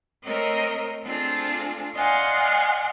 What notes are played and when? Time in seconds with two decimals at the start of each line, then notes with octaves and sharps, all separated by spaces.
0.24 A3 C4 A#4 C#5 D#5
1.04 A3 C4 D4 F4 G#4 A4
1.95 D5 D#5 F5 F#5 G#5 C6